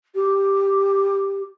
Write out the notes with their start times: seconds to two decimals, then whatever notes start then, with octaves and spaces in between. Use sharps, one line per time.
0.15 G4